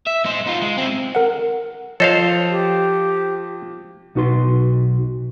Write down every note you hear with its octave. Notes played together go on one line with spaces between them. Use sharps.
E5
D#4 C5
D#4 F4
G#3
C4 E4
A#4 F#5
F3 A4 C5 C#5 D#5 F5 A5
G4
B1 D#4 F#4 B4 C6